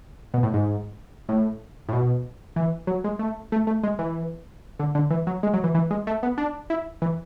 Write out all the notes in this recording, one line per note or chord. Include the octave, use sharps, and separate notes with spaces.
B2
A2
G#2
A2
A2
B2
E3
F#3
G#3
A3
A3
A3
G#3
E3
D3
D3
E3
F#3
G#3
F#3
E3
E3
G#3
A3
B3
D4
E4
E3